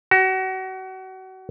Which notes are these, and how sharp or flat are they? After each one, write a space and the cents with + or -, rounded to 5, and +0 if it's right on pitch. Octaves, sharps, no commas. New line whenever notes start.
F#4 +30